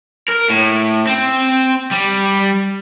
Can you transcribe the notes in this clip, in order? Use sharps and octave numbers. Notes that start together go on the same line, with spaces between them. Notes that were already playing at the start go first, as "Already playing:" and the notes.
A#4
A2
C4
G3